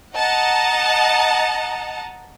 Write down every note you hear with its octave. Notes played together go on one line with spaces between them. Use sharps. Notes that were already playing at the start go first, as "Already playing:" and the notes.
D#5 F#5 A5 A#5